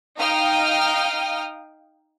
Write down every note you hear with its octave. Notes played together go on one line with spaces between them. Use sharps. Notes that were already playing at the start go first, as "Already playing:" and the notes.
D#4 F5 G5 D#6 F6